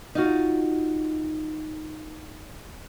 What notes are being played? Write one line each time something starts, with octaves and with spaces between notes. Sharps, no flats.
D#4 F4 F#4